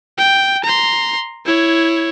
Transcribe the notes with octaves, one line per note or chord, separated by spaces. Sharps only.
G5
A#5 C6
E4 C#5